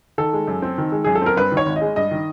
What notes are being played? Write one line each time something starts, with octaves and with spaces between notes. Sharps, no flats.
D#3 A4
G#3
F#2
C4
D#3
G#3
F#2 G#4
A4
C4 A#4
G2 B4
D#3
C#5
G#1
D#5
G#3
G2 D#5
D#3